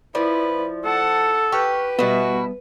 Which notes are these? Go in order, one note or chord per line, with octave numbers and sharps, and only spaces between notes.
F3 E4 B4 D5
A4 F#5 A5
G4 B4 C#6 F6 F#6
B2 G3 B3 E4 F#4